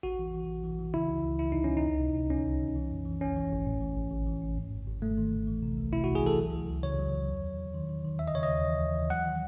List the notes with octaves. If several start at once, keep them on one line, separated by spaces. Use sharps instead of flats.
A1 F#4
E3
E3
A1
E3
E3
C#3 E4
C#2
C#2
C#2 E4
C#2 D#4
C#4
C#2
D#4
C2
C3
C3
C2 C#4
C2
C2
E3
F#2
E3
G#1 C#4
E3
G#1
A2
E3
A1
A1
E3
A2
G#2
G#1
G#1
G#2 A3
D#3
G#1
E3
C3
C2
C3 E4
F#4
C2
G#4
E3 A4
F#3
C#2
C#2
C#3 C#5
F#3
F#3
E2
E2
E2
D#3
D#3
D#3
D#2 E5
D#5
C#3 C#5
D#5
D#2
E3
D#2
E3
F#3 F#5
D#3